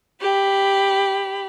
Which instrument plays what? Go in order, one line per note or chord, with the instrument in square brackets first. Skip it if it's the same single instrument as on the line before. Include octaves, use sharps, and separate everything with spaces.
[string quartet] G4 B5